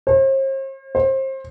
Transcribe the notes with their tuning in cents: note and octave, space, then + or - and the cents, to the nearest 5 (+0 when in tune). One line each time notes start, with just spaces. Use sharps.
C5 +45
C5 +30